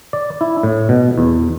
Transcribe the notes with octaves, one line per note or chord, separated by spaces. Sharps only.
D5
E4
A2
B2
E2